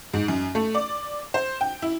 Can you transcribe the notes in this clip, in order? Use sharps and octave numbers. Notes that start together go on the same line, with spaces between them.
G#2
F#2
A3
D5
C5
G5
E4